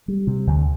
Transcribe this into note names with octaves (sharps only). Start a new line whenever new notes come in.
G3
C3
D2